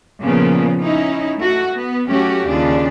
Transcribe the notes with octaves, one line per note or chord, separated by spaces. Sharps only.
A#2 C#3 F3 A#3 B3
C#4 D#4 E4
A3 F#4
B3
F#3 A3 C#4 F#4 G4
D#2 C#3 D4 F4